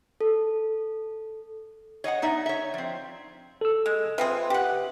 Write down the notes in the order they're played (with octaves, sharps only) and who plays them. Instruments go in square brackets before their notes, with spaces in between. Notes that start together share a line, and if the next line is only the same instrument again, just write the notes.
[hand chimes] A4
[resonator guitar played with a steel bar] C#5 D#5 F5 F#5
B3 D#4 D5 E5
C#5 E5
F3 C4
[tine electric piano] A4 E6
[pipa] G#3
[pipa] F3 C4 G#4 [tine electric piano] B4 E5
[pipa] G4 F#5